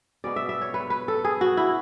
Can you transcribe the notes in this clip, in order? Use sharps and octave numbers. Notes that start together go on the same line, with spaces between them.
B2 G#3 B3 D5
E5
E5
C#5
B4
B4
A4
G#4
F#4
E4